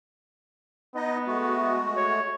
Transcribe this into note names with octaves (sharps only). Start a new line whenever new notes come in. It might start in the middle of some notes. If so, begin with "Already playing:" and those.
B3 D#4 D#5
G#3 A3 F#4
C#5